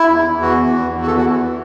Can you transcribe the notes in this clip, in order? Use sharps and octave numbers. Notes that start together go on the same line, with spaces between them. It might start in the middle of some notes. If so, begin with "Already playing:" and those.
Already playing: E4
E2
E2
E3 F#4
E3
E2
E2
F#4
E3 A4
F#4
E3